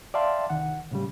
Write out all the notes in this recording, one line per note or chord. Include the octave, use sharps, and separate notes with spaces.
D5 E5 F5 G5 A5 C6
C2 D#3 F#5
A2 C#3 G3